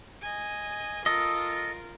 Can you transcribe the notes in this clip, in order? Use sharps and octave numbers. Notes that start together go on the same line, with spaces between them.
D#5 G#5
F4 A4 A#4 D#5